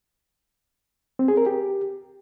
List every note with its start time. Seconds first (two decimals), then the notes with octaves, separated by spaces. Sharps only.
1.19 C4
1.28 G#4
1.37 A#4
1.46 G4